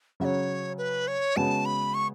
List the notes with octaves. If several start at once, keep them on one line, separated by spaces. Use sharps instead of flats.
C#3 F#3 C#4 F#4 C#5 E5
B4
C#5
C#3 G#3 B3 F#4 A5
B5
C#6